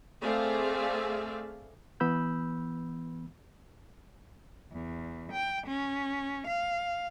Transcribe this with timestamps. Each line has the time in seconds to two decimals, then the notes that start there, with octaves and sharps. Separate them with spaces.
0.21 A3 C4 G#4 D5 E5 F5
2.00 E3 B3 B5 E6 G6
4.72 E2
5.32 G5
5.67 C#4
6.47 F5